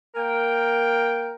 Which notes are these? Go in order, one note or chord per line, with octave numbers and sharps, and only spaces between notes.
A#3 A#4 G5